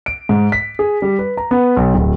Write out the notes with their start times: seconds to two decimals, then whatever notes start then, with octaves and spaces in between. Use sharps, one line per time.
0.06 D7
0.29 G#2
0.52 B6
0.79 G#4
1.02 G3
1.19 B4
1.37 A#5
1.51 B3
1.76 B1
1.94 D1